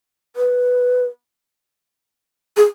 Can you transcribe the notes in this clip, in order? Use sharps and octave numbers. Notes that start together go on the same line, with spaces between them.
B4
G#4